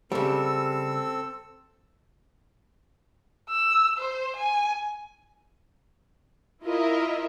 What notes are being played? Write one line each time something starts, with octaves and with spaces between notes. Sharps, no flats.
C#3 G3 C4 A4 E6
E6
C5
G#5
E4 F4 A#4 D#5 E5